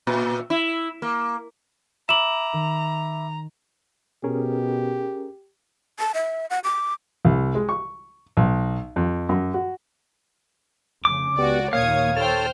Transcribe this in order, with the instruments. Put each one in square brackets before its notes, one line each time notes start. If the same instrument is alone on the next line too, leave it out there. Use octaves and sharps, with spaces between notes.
[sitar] A#2
E4
A#3
[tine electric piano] E5 B5 D6 [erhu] A#5 [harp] G#6 D7 [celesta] E7 F#7
[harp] D#3
[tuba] B2 [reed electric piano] C#4 G#4 A#4 [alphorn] G4
[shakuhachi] A5
E5
F#5
D6
[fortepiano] C2
G#3
C#6
B1
F2
F#2
F#4
[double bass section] F1 C#3 [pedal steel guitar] D6
[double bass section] C#2 [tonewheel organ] B3 G4 [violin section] F#4 D5
[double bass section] D#2 A#2 [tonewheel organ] A#3 [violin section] C#5 D#6 G#6 [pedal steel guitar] F5
[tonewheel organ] A4 C#5 A5 [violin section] C5 G5 F6